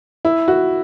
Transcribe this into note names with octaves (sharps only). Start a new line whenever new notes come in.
E4
F#4